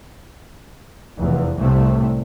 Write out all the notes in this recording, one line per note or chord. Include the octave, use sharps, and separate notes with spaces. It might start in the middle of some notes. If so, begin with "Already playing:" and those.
F1 E2
C2 A2 C3 A3